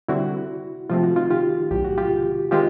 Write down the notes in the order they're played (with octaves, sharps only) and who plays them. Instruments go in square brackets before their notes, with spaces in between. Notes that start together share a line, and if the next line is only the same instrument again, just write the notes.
[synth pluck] D3 G3 C4 [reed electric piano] E4 F#4
[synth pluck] C3 F3 A3 C4 [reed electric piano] F4
[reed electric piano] F#4
D#4 F4
F4 G4
[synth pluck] B1 A2 F#3 [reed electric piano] G4
[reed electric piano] F#4
F4 G4
[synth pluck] D#3 G#3 C4 [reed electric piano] F4 G4